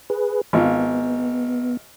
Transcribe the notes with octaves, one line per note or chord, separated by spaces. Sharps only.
G#4 B4
G#1 B3 F4